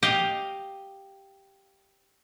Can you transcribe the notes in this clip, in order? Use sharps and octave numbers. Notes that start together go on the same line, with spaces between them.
G4 D#5 F5